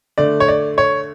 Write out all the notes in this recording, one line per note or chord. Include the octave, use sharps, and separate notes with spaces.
D3 A3 D5
C#5
D5
C#5